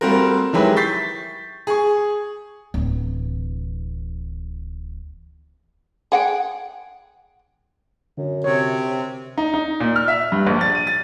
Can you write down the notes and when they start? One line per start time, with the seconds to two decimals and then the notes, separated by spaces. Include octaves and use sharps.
0.01 G3 A3 A#3 C4 F#4 A#4
0.53 D#3 F#3 G#3 E4 G4 B4
0.76 C#6 G6 A6 B6 C7
1.67 G#4 C#6
2.74 D1 E3
6.12 G#4 F#5 G5
8.18 F#2 D3
8.44 C3 C#5
9.38 D#4
9.54 D#4
9.80 A#2
9.96 F6
10.08 E5
10.32 G2
10.47 A#1
10.61 A6
10.75 D#7
10.87 A6